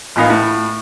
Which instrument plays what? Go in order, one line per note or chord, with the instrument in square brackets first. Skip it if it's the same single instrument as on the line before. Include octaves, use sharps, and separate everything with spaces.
[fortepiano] A1 A#2 B3 D#4 F5
A2